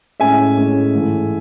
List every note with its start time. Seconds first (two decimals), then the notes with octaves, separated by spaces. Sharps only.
0.20 A2 G#3 C#4 E5 G#5
0.57 A2 G#3 C#4
0.94 G#2 E3 A3